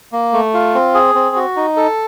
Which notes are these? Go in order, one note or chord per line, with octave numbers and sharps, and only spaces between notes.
A#3
A3
F4
C4
G#4
C4
F#4
D#4
A4